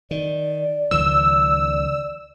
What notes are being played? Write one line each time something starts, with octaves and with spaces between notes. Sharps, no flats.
D#3 D5
C#2 D#3 F3 E6